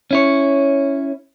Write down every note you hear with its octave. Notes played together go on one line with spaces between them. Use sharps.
C#4 E4 C#5